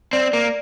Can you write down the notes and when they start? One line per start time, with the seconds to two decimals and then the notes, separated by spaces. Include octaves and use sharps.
0.13 C4 D5
0.32 A#3 D5